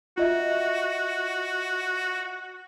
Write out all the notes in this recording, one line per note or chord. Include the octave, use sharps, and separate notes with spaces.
F4 F#4 D#5 E5